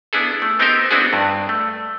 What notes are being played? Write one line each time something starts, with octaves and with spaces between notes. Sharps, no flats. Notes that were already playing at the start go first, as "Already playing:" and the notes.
B3 D4 E4 G#4 A4
A3
B3 C4 D#4 G4 A#4 C5
B3 C4 D4 E4 F#4 G#4
G2
A3